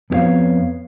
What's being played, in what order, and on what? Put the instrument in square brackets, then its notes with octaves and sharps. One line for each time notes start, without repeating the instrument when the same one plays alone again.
[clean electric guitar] F2 B3 E4 G4 C#5 F5